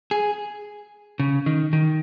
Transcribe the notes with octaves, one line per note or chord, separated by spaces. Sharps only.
G#4
C#3
D#3
D#3